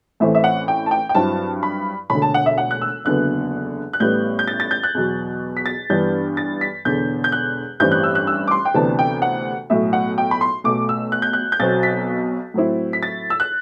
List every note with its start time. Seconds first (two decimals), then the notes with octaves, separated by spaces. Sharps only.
0.20 A1 A2 E3 A3 C4 E5
0.35 E5
0.44 F#5
0.68 G5
0.86 A5
0.91 G5
1.09 G5
1.15 G2 F#3 C4 E4 A5
1.63 B5
2.10 E1 D2 D3 B5
2.22 A5
2.34 F#5
2.46 E5
2.58 F#5
2.71 F#6
2.82 E6
3.05 F#1 E2 D3 F#3 B3 F#6
3.93 F#6
4.00 A1 A2 G3 B3 G6
4.39 G6
4.48 A6
4.60 A6
4.71 G6
4.83 F#6
4.95 E2 B2 F#3
5.57 B6
5.66 A6
5.90 G2 E3 G3 B3 D4 G6
6.37 A6
6.61 B6
6.85 E1 E2 D3 G6
7.24 G6
7.32 F#6
7.80 A1 G2 E3 G3 C4 G6
7.92 F#6
8.04 E6
8.15 F#6
8.27 E6
8.48 D6
8.51 C6
8.65 G5
8.74 D2 C3 E3 B3 D4 A5
8.99 G5
9.22 F#5
9.70 B1 A2 F#3 E5
9.93 F#5
10.18 G5
10.31 B5
10.41 C6
10.64 B1 B2 A3 D6
10.89 E6
11.12 F#6
11.22 G6
11.33 F#6
11.52 G6
11.60 B1 B2 F#3 C4 A6
11.83 B6
12.54 A2 F#3 C4 E4
12.93 B6
13.03 A6
13.30 E6
13.40 F#6